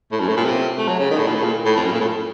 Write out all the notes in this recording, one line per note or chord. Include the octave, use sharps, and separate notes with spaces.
A2
F#2
A2
A#2
C3
A3
F#3
C#3
D#3
A2
A#2
A2
A#2
A2
F2
F#2
A#2
A2